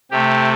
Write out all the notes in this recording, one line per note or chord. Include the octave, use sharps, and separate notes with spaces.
C3 A3 G4